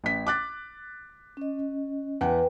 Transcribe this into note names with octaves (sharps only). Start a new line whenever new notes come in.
A1 B6
D6 F#6 A6
C#4 D#5
E2 B4 F#5 G5